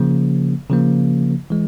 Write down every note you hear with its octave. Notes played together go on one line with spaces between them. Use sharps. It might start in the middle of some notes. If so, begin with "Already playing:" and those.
Already playing: C#3 F3 A#3
C#3 F3 A#3
E3 G#3